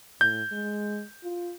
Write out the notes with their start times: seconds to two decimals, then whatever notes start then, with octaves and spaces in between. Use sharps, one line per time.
0.21 A2 G6
0.52 G#3
1.24 F4